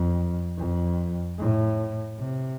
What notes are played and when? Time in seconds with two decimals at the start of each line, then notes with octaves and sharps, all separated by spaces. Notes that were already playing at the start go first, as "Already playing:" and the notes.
Already playing: F2
0.58 F2
1.38 A2
2.19 C3